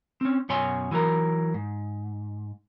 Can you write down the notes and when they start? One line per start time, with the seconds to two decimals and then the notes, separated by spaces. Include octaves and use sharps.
0.21 C4 C#4
0.49 F#2 B2 C#5 G#5 C6
0.91 E3 F#3 A#3 A#4
1.54 G#2